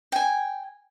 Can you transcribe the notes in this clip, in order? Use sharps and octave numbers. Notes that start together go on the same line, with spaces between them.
G5 G#5